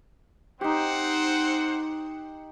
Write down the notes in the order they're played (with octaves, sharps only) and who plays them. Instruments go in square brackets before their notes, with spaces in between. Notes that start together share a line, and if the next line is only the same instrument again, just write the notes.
[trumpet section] C4 C5 F#5 [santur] D#4 G4